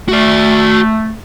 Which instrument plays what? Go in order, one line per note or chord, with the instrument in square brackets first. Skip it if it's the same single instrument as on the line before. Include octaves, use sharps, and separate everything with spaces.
[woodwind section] A3 [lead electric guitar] F#4 D5